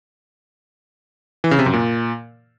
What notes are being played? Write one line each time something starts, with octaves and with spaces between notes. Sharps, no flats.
E3
C#3
C3
F#2
A#2